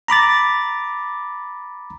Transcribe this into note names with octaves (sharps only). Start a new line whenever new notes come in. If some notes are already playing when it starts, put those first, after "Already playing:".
A#5 B5 D6 A6